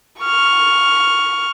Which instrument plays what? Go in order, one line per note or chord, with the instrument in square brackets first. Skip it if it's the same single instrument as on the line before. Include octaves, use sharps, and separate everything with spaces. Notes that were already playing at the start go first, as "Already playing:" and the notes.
[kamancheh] C#6 F6